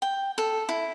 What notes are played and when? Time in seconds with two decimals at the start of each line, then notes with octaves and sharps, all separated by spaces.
0.02 G5
0.38 A4
0.69 E4